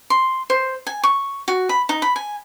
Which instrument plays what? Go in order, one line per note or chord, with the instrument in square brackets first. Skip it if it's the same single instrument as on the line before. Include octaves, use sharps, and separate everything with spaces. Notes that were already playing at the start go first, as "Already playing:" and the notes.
[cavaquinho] C6
C5
G#5
C#6
F#4
B5
D#4
B5
G#5